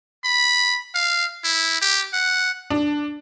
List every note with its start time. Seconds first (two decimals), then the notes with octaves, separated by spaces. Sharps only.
0.24 B5
0.95 F5
1.44 E4
1.81 G4
2.13 F#5
2.70 D4